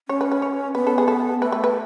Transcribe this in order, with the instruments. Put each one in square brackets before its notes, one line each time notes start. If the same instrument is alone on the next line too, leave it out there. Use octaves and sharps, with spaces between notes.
[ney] C#4 [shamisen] C#5
[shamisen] B4
B4
C#5
[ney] B3 [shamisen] B4
[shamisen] A4
G#4
A4
[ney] A3 [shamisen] B4
[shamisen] B4
B4